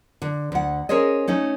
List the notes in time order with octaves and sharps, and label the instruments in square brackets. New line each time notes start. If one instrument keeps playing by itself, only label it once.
[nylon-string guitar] D3
D2 F#5
C#4 G#4 A#4 C5 C#5 D#5
A3 C#4 D#4